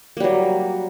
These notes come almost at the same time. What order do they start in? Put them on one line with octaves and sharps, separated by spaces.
A#3 G3 F#3